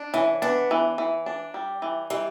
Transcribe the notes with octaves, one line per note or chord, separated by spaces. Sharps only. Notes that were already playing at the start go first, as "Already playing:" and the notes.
Already playing: D4
E3 C#4
B3 D4
E3
E3
D4
G3
E3
E3 G3